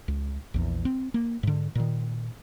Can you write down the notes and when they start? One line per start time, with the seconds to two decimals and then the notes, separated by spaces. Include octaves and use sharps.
0.08 C#2
0.54 A#1 E2
0.85 C4
1.14 A#3
1.43 G#2 D3
1.75 A#2 D#3